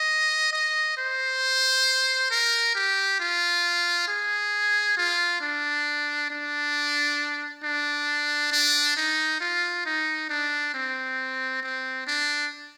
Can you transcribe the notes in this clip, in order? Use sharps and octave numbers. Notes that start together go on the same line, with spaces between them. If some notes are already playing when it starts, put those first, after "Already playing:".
Already playing: D#5
D#5
C5
A#4
G4
F4
G#4
F4
D4
D4
D4
D4
D#4
F4
D#4
D4
C4
C4
D4